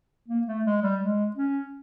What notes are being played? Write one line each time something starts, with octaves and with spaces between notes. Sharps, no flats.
A#3
A3
G#3
G3
G#3
C#4